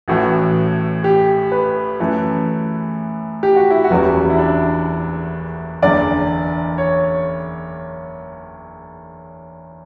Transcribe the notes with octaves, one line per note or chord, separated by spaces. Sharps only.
A1 A2 E3 A3 F#4
G4
B4
F#2 E3 A3
G4
F#4
E4
F#4
F#1 E2 C#3 G3 B3
E4
D4
F#1 E2 D3 D5
C#5